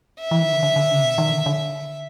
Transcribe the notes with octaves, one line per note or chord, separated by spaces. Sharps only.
E5
E3
D#3
D3
D3
D3
C#3
B2
D#3
D3
D3